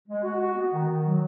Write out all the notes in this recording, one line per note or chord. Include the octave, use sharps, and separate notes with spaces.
G#3
F#4
F#4
B3
D#3
D#3
F#3